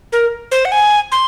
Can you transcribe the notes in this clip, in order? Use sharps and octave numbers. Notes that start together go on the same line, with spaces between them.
A#4
C5
F#5
G#5
C6